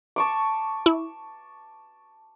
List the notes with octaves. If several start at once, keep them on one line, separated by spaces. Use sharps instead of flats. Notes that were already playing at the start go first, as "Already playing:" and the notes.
A5 C#6 D6
E4